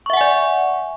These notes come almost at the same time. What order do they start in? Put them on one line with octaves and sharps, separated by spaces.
C#6 E5 F#5 G#5 D5